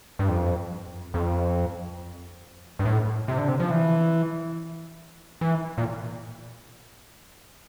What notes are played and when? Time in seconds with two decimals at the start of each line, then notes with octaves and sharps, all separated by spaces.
0.19 G2
0.29 F2
1.14 F2
2.79 G2
2.85 A2
3.28 C3
3.38 D3
3.48 C3
3.60 F3
3.71 E3
5.41 E3
5.78 A#2